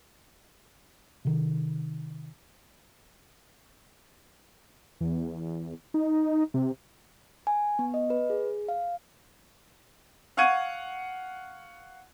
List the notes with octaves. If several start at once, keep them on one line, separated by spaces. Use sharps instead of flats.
C3 D#3
E2
D#4
C3
G#5
B3
D#5
B4
G#4
F5
F5 F#5 C#6 G#6 D#7